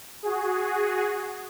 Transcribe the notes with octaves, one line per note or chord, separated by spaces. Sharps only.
F#4 G#4